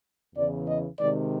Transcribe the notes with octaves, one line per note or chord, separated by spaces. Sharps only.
E2 C#3 E3 D5
D#5
C3 D#3 G#3 D5